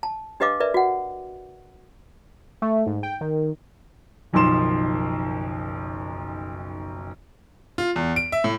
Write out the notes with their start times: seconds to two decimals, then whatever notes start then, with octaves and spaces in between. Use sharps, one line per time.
0.03 A5
0.40 D4 G4 B4 D#5 F5 D6
0.60 A#4 B4 D5 E5
0.74 F#4 F#5
2.62 A3
2.87 G#2
3.03 G5
3.21 D#3
4.33 F#1 B1 D#3 F3 C6 E7
7.78 F4
7.96 E2
8.16 D7
8.32 E5
8.44 A2